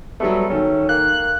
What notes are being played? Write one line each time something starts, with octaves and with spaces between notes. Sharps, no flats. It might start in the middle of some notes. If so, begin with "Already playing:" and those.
F#3 G3 A3 B3
D#3 C#4 A4
A#3 F#6